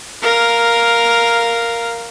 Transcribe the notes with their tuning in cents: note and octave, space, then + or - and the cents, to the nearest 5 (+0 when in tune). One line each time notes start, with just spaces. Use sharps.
A#4 +0 F5 +0